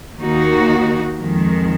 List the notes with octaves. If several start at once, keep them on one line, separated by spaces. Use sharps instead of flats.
D#2 D#3 A#3 D#4 F#4
F2 D#3 G#3